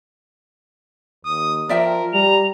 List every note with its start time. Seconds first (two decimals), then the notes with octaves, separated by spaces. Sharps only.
1.25 D#2 D#6
1.69 F3 A#4 D5 E5 G5
2.14 G3 A#5 F7